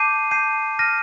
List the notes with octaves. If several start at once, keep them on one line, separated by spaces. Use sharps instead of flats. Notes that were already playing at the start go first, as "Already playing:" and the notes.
Already playing: A5 D6 G6 C7 D#7
A5 D6 G6 C7 D#7
F6 A#6 D#7